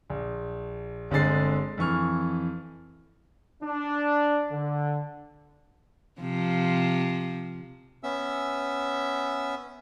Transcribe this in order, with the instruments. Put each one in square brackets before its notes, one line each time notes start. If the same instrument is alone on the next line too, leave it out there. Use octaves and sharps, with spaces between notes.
[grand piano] A#1
G1 D3 G#3 C4 A6 C7
F2 E3 C#6 F6
[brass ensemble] D4
D3
[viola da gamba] C3 F3
[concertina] B3 C#4 E5 E6